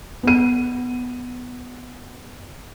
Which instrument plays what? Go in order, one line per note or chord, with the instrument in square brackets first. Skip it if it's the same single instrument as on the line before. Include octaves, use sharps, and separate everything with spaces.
[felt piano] B3 D#7